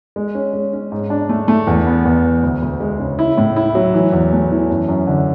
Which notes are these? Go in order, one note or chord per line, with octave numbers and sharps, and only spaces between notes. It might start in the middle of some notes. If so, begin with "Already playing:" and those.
G#3
C#4
G#3
C#4
G#2
D4
A3
A3
E2
B3
E2
B3
D2
D2
G#3
C#3
E4
A2
E4
F#3
E3
E2
A3
E3
F#2
F#2
D3